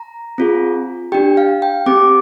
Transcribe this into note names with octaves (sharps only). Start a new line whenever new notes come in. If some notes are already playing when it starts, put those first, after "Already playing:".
Already playing: A#5
C4 F4 G#4
D4 G4 G5
F5
G5
C4 G4 D6